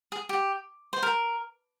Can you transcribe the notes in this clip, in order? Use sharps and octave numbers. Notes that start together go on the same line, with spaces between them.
G#4
G4
C5
A#4